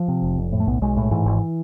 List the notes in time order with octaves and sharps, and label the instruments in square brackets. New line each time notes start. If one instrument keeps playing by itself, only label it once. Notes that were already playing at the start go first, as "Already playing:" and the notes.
Already playing: [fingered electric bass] F3
C3
F1
F2
A2
A3
B1 B3
B1 G#3
A2
G#2 E3
G#1